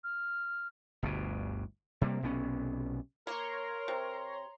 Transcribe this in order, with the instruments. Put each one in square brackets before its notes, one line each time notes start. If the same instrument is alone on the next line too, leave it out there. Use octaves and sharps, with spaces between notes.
[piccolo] F6
[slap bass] G1 D2 G2 B2
C3 G3 A#3
B1 C3 B3 C#4
[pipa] A#3 [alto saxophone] A#4 [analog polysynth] C#5 A#5 C6
[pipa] C3